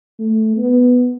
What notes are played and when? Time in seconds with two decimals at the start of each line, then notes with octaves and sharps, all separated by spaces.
0.19 A3
0.57 B3